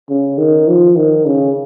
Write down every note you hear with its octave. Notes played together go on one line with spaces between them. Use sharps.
C#3
D#3
F3
D#3
C#3